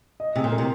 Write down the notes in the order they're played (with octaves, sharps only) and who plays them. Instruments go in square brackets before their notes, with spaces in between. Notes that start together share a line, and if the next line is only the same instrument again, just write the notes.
[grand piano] D#5
[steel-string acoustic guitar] C3 [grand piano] G#4
[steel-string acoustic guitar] A#2
[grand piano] A#3
[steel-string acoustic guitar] C3